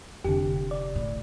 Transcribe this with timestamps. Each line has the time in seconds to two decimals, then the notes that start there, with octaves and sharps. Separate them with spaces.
0.24 F1 D3 G4
0.71 D5
0.95 A2